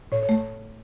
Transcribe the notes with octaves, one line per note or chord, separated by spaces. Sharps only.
A2 C#5
C#5
A3